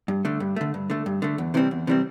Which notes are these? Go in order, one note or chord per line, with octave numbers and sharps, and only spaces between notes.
G2
D3 A3
G2
D3 A3
G2
D3 A3
G2
D3 A3
E2
C3 E3 G3 C4
E2
C3 E3 G3 C4